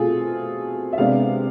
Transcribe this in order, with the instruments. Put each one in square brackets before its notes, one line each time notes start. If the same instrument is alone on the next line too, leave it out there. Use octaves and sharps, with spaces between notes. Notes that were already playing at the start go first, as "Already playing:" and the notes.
Already playing: [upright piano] B2 A3 C4 F4 G#4 A4
E5
C3 G#3 B3 D4 F5